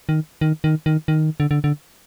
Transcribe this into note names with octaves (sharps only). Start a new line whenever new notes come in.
D#3
D#3
D#3
D#3
D#3
D3
D3
D3